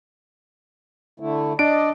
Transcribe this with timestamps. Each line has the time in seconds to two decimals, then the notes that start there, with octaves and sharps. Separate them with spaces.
1.20 D3 A3 E4
1.59 D4 D5 D#5 D7